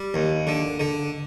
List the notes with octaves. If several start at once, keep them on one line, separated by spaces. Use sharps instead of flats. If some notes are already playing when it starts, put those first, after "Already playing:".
Already playing: G3
D#2
D3
D3